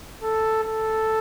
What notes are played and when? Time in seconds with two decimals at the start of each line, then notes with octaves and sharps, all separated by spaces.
0.22 A4
0.64 A4